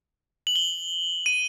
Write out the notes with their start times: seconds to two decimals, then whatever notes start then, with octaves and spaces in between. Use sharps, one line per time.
0.47 F#7
0.56 G7
1.26 D#7